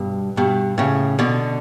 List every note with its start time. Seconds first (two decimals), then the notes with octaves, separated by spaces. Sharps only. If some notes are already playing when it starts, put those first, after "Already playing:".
Already playing: G2 B2
0.37 G2 B2
0.78 A2 C#3
1.19 B2 D3